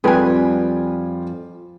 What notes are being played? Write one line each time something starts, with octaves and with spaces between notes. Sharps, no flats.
F2 G3 F4 G#4 B4 G5 G#5